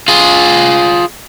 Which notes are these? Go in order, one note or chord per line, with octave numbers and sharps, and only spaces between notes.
F4 G#4